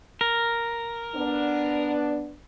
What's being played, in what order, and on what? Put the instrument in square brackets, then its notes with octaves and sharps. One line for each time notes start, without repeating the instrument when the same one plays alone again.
[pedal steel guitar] A#4
[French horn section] B3 D4